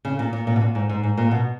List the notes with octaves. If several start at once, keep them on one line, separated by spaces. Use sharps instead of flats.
C#3
A#2
A#2
A#2
B2
A#2
G#2
G#2
G#2
A#2
B2